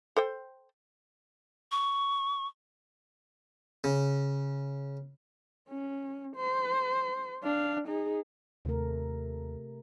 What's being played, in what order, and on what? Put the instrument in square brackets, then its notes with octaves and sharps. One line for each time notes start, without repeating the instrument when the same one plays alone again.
[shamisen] A4 C5 G5
[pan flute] C#6
[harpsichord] C#3
[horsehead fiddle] C#4
C5
D4 F5
D#4 G#4
[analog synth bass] D#2 [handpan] C3 A3 A#4